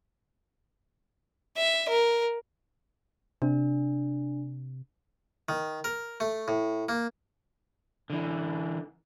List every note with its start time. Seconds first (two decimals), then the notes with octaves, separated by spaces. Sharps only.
1.56 E5
1.89 A#4
3.42 C3 D4
5.49 D#3
5.84 A#4
6.20 A3
6.48 A2
6.89 A#3
8.10 D3 E3